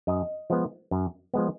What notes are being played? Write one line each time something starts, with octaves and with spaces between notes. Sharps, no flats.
F#2 D#5
F3 G#3 B3
F#2
F3 G#3 B3